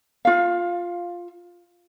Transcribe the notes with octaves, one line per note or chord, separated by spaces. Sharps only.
F4 F5